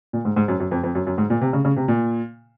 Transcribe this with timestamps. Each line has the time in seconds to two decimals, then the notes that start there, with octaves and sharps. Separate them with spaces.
0.13 A#2
0.25 G#2
0.36 G#2
0.48 F#2
0.60 F#2
0.71 F2
0.84 F2
0.95 F#2
1.07 F#2
1.18 G#2
1.30 A#2
1.41 C3
1.53 C#3
1.65 C#3
1.76 C3
1.88 A#2